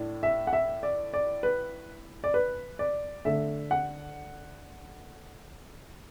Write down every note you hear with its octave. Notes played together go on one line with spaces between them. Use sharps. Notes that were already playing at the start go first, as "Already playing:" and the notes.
Already playing: A2 D4
E5
F#5
E5
D5
D5
B4
D5
B4
D5
D3 A3 D4 E5
F#5